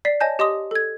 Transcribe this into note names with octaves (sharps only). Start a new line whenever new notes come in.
D5 B6 C7
C#5 D#5 G#5 A5 G6
G4 D#5 C6 D#6
A4 G#6